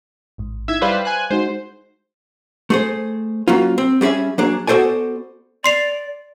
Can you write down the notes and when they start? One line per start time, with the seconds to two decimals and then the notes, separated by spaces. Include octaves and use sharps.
0.38 A1 G#2
0.68 D#4 E4 E5 G#6
0.82 G3 B4 C5 D5 F5 C6
1.05 G#5 F#6
1.31 G#3 D#4 F#4 C5
2.70 A3 G#4 C5
3.48 F#3 A#3 C#4 F4
3.78 C4
4.01 G3 C#4 G#4 E5 G#5
4.38 F#3 A#3 D4 G#4
4.67 B3 F#4 A4 C5 D5 G#5
5.64 D5 C6 C7 F7